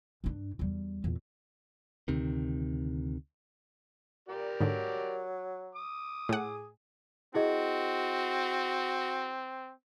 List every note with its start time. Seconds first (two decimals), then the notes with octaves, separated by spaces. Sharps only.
0.24 G2 D4
0.59 E2 G3
1.04 E2 A#2
2.08 D2 C3 D#3
4.29 A#2 G4 A#4 D5
4.61 G#2 D3 F#3
5.75 D6 D#6
6.29 A2 G#4 F#5
7.35 C4 E4 F#4 G#4 D#5